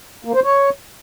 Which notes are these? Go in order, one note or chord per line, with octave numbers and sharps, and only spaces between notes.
A#3
C5
C#5